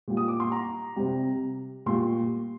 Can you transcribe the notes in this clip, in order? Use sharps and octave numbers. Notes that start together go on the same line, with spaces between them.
A#2 G3
D#6
D6
C6
A#5
C3 G3
A#2 G3 C6